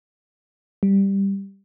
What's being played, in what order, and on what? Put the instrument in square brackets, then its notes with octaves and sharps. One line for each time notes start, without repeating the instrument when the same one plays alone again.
[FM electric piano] G3